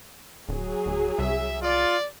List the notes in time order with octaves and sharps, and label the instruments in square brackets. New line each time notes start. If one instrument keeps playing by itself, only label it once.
[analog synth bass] D1 [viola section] F#3 G#4
[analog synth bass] D1
[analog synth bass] C2 [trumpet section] E5
[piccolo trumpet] F4 [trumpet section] D5